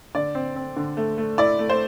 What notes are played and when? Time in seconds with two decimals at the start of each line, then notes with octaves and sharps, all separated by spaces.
0.15 D3 D5
0.35 C4
0.56 C4
0.76 D3
0.97 A3
1.18 A3
1.38 E4 D5
1.59 A3
1.70 C5